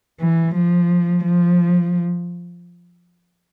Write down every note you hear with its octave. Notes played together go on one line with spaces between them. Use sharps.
E3
F3
F3